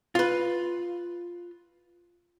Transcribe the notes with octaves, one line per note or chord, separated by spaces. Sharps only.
F4 B4